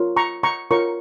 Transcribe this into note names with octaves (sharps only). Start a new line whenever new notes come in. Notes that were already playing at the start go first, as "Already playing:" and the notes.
Already playing: F4 A#4 C#5
A#5 C#6
A#5 C#6
F4 A#4 C#5 A#5 C#6